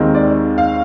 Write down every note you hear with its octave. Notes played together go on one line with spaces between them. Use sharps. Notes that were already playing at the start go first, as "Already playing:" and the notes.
Already playing: D#2 D#3 G#3 C4
D5
F5